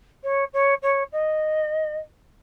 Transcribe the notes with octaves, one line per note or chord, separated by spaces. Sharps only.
C#5
C#5
C#5
D#5